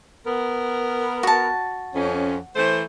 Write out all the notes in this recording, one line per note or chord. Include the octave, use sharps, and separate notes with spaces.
B3 A#4
F#4 A5
F2 C#4
E3 A3 C5